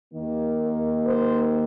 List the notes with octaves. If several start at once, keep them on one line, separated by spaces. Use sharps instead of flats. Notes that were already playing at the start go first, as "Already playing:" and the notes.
D#2 D#3 A#3
A#4
C5